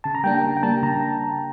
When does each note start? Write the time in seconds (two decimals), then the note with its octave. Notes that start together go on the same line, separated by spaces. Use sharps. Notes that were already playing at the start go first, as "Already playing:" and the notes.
0.04 C#3 A5
0.15 A#5
0.24 G3 A#3 D4 G5
0.34 G5
0.44 C#3
0.57 G5
0.63 G3 A#3 D4 A5
0.83 C#3 A#5